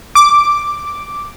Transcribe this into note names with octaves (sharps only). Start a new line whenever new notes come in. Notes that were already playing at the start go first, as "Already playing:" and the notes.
D6